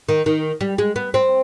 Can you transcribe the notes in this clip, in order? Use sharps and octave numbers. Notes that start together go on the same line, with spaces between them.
D#3
D#3
G3
G#3
B3
C4